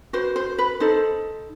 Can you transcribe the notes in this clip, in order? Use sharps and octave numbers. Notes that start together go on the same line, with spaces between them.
F#4 B4 C5
C5
B4
D#4 A4 C5